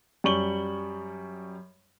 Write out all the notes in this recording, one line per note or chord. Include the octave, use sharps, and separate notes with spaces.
F#2 G3 C#6 F#7 G7